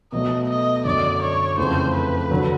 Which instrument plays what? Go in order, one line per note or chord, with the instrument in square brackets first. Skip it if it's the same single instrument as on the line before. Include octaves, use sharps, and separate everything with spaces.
[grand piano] B2 F#3 A3 [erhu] D#5
[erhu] D#5
[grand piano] F#2 D3 F#3 [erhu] D5
[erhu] C#5
[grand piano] F2 C#3 E3 A3 [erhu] C5
[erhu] B4
[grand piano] D3 F#3